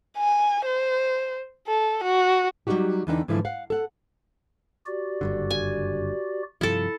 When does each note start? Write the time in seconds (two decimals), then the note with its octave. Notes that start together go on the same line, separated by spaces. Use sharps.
0.18 G#5
0.66 C5
1.68 A4
2.03 F#4
2.67 F#3 G3 C4 D#4 F#4 G4
3.07 E2 D3 E3 D4 D#4 G5
3.28 G#2 D3 E3 F3 E4
3.45 F5 F#5
3.70 A4 F#5
4.86 F#4 G4 D5
5.21 F#1 G2 D3
5.50 G#5
6.61 G2 C3 F3 E4 A4